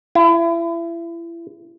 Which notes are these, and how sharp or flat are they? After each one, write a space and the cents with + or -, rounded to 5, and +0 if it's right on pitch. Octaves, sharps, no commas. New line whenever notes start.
E4 +30